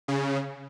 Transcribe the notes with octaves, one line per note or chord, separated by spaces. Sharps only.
C#3